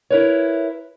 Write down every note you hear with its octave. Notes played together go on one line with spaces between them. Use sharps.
E4 A#4 B4 C#5